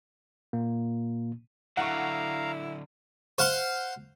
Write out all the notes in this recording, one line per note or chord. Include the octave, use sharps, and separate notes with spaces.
A#2 A#3
D3 F#3 E4 F5 F#5 A#5 C#6
C5 F5 F#5 C6